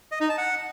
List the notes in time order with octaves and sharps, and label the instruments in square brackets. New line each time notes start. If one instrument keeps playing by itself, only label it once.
[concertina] D#5
D#4
A5
F#5